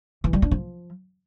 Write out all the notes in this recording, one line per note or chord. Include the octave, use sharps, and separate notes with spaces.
E3
G3
D4
F3